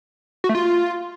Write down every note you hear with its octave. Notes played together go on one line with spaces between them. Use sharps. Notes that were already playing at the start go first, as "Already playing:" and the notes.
F#4
A3
F4